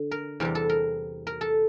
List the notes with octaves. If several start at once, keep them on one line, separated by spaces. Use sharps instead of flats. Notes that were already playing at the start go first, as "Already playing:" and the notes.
Already playing: D3
A#4
E2 C3 G3 A#4
A4
A#4
A#4
A4